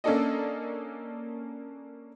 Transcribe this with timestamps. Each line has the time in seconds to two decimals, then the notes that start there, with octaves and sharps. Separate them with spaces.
0.04 A#3 C#4 D4 A4 D5 D#5